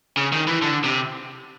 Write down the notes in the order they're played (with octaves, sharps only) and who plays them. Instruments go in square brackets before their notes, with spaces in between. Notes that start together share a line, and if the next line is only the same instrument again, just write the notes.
[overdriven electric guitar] C#3
D#3
E3
D3
C3